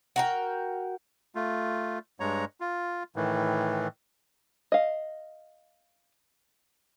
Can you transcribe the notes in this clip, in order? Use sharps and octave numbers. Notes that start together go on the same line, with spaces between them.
F#4 A#4 G5
A3 F4
G2 G#3 C#5 A#5
F4
A2 D#3 E3
D#5 F5